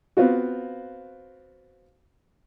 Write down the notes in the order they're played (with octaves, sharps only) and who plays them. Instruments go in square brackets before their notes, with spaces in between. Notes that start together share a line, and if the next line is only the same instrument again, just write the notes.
[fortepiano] B3 C4 F4 F#4